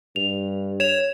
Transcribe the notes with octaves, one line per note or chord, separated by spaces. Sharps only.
G2 F7
C#5 E7 F7